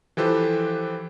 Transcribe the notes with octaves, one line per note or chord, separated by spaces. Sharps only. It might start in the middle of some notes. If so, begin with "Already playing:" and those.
E3 F3 G4 A4 B4 C5